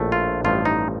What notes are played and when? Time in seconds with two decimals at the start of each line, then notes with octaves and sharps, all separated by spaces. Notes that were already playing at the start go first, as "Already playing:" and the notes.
Already playing: A#1 A2 A3
0.12 F4
0.44 A1 G2 F3 A3 F4
0.65 D#4